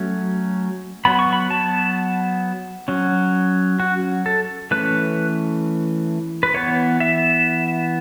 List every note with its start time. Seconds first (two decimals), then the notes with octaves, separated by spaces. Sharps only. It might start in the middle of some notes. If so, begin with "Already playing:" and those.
Already playing: F#3 A3 C#4
1.05 F#3 B3 B5
1.19 C#6
1.33 B5
1.50 A5
2.88 F#3 C#4
3.80 F#4
4.26 A4
4.71 E3 A3 C#4 B4
6.43 B4
6.54 E3 B3 C#5
7.00 E5